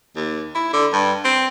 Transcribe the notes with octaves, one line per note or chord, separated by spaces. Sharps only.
D#2
E4
D3
G2
C4